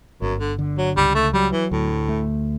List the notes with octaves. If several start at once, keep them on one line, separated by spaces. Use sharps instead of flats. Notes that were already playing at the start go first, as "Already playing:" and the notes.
G1 F#2
D3
D3
F#3
C#2 G3
A3
F#3 G3
E3
D2 A2
A3